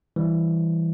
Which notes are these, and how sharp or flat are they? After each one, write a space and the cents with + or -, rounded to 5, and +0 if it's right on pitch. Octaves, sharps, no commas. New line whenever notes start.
E3 +0 G3 +0